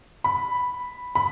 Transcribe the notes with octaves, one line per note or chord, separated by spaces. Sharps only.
B5
B5